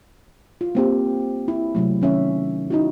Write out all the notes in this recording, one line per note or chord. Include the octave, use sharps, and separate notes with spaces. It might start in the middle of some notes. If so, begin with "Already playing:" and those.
F4
A#3 C4 G4
E4
C3 F#3 A3
D#3 C#4 E5
D#4 E4 F#4